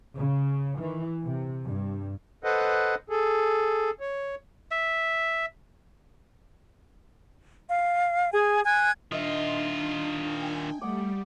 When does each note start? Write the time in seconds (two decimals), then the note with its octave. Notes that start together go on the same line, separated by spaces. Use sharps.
0.16 C#3
0.79 E3
1.23 C3
1.66 G2
2.44 A4 B4 C5 D#5 F#5
3.10 G#4 A4
4.00 C#5
4.71 E5
7.67 F5
8.33 G#4 G#5
8.65 G#5 F#6 G#6
9.12 D#3 D4 F4 D#5 E5 C6
10.22 G5 G#5
10.81 G3 A3 D5 F#5 D#6